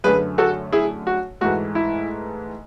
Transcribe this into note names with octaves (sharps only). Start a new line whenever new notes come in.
F#2 D3 A3 G#4 B4
F#4 A4
E4 G#4
F#4
G#2 E3 A3 F#4
E4